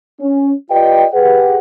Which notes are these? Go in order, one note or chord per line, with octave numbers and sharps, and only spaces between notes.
C#4
F4 G4 B4 D5 D#5 G5
G4 G#4 B4 F#5